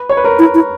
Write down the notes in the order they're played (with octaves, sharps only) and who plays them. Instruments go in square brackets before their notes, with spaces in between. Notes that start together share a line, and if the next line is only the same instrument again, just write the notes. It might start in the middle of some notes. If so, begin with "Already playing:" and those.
Already playing: [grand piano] B4
C#5
B4
A#4 C#5
[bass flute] E4
E4